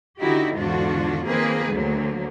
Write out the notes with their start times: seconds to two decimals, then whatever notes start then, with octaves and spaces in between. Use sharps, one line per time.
0.21 D3 D#4 E4 F#4 G4
0.56 E2 G#2 D3 D4 F4 F#4
1.24 D#3 F3 A#3 C4 G#4 B4
1.71 D2 D3 F#3 A#3